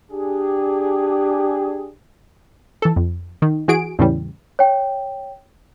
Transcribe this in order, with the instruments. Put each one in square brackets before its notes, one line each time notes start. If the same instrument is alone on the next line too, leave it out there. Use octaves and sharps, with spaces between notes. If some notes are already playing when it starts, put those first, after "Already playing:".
[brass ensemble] D4 G4 G#4
[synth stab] E3 A4
F2
D#3
E3 F#4 G#4 D7
E2 A2 C#3 E3 G3
[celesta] C#5 G5